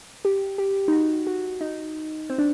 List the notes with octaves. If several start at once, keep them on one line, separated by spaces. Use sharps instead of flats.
G4
G4
D#4
F#4
F#4
D#4
C4
D4